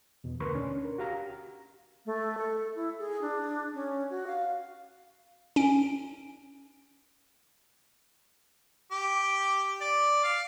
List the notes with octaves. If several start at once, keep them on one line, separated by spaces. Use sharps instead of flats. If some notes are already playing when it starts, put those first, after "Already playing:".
E2 B2
D2 A#4 B4 C6 C#6
C#4 D4
A#4
F#4 G4 F5 A#5
A3
A4
E4
G#4
D4
C#4
F#4
F5
C#4 D7
G4
D5
F5